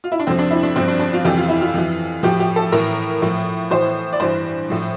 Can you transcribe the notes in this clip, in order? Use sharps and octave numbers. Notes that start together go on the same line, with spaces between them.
F4
E4
D4
F2 C3 F3 C4
D4
E4
D4
G2 F3 C4
D4
D4
F4
F2 C3 E3 G4
F4
E4
F4
F2 E3
A2 F3 G4
G4
A4
A2 E3 A#4
A2 F3
A2 E3 C5
D5
G2 E3 C5
A2 F3